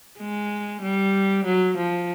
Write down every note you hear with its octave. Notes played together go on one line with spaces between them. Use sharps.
G#3
G3
F#3
F3